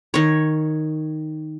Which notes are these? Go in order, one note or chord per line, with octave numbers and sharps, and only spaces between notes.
D#3 C#5